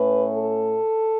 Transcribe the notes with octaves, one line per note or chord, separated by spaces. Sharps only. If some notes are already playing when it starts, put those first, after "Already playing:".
Already playing: A2 A3 C#4 B4
A4